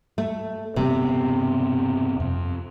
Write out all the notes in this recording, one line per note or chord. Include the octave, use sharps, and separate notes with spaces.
A3
E1 G2 C3 B3
F2